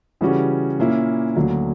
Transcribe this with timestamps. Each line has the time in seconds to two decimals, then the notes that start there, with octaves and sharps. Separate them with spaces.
0.21 C#3 E3 G3 C#4 F#4
0.79 A#2 A#3 C#4 E4
1.36 D2 D3 F#3 A#3